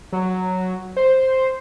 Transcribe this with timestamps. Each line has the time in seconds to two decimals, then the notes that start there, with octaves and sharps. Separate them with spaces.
0.12 F#3
0.97 C5